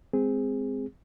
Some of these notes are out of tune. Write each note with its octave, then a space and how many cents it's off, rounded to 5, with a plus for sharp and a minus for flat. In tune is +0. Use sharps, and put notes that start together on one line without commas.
G#3 +0 C4 -15 G#4 -20